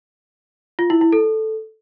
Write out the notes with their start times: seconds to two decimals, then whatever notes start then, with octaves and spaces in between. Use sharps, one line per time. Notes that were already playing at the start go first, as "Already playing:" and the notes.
0.79 F4
0.90 E4
1.01 E4
1.12 A4